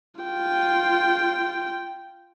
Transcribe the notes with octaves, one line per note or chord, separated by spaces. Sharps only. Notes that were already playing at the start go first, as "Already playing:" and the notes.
F4 G5